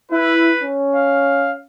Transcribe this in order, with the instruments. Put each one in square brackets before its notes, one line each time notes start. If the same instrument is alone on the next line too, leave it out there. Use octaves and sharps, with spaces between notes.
[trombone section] E4 [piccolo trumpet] B4
[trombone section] C#4
[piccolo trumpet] F5